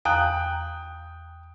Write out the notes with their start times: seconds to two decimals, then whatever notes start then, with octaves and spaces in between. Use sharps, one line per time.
0.05 E2 F5 G5 A#5 D#6 F#6